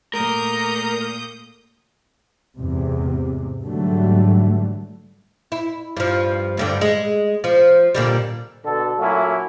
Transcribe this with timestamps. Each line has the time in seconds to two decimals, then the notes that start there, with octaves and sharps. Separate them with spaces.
0.14 A#2 A3 A#4 D#6 G6
2.58 E2 G#2 C3
3.62 G#2 D3 E3 F#3 G3 A3
5.52 E4
5.97 G2 F3
6.57 D2 G2 D3
6.81 G#3
7.44 F3
7.95 A#2 D3 G3
8.65 B2 D3 A4
8.99 A#2 F#3 A3 A#3 C#4 E4